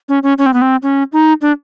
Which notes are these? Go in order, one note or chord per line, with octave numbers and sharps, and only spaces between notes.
C#4
C#4
C#4
C4
B3
C4
C#4
D#4
D4